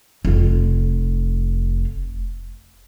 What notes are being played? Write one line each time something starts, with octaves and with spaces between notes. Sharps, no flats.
F1 F4